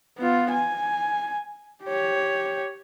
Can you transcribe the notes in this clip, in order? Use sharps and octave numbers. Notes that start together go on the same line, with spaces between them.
B3 F4
G#5
G4 C#5